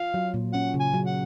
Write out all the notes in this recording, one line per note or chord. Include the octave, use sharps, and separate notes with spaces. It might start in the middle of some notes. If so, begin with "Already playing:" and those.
Already playing: F4 F5
F#3
A#2
C#4 F#5
C#3
G#5
F#3
F#5